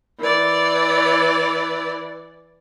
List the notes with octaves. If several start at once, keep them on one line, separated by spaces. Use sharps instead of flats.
E3 D5